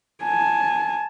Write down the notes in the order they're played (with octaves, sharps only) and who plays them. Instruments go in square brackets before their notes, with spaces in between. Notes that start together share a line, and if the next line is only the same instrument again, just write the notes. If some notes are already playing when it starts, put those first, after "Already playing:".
[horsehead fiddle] G#5 A5